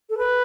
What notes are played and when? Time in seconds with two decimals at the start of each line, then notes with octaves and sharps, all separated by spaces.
0.10 A4
0.18 B4